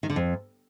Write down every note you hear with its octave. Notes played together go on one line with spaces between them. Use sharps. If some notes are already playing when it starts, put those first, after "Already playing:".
D#3
D3
F2